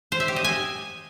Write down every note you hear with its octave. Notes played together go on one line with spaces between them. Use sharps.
C5
E5
G4
D#5
G#5